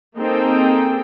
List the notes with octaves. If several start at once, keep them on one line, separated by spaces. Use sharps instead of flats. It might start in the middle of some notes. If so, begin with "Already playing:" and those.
A#3 C4 D#4 G#4 A4 G5